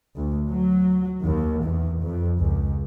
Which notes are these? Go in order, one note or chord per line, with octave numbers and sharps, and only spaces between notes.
D2
F#3
D#2
E2
F2
C#2